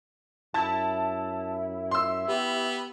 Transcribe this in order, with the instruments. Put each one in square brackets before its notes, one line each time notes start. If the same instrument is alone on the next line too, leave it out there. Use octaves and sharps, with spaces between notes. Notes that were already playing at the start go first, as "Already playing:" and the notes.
[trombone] F#2 [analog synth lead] E4 [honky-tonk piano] A5
[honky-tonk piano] C6 E6
[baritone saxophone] B3 [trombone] G4